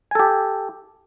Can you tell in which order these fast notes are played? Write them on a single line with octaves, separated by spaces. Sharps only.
G#5 A4 G4